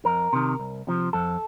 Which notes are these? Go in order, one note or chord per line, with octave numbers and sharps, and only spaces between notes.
F2 A#4
C3 D#3
C2
C3 F3
F2 A4